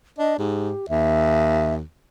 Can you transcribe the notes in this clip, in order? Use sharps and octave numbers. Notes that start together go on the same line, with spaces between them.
D4 D#5
G#2 G4
D#2 E5